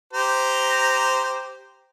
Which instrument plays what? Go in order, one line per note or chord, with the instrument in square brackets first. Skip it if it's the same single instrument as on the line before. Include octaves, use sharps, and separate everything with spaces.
[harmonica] G4 C5 A#5